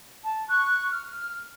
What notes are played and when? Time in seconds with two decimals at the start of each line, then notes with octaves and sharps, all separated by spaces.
0.24 A5
0.49 C#6 F#6
0.90 F6